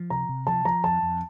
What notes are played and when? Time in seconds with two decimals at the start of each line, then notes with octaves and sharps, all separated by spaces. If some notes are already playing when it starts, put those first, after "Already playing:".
Already playing: F3
0.10 C3 A#5
0.29 C3
0.47 F3 A5
0.65 F3 A#5
0.84 F2 A5
1.02 F2